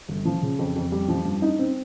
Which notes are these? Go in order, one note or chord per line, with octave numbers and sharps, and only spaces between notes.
G1
F3
C#3
F2
F2
G3
F3
G2
D#4
C4